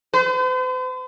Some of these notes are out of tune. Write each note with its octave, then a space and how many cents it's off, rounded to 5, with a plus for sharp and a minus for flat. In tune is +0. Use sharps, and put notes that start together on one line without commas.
C5 -45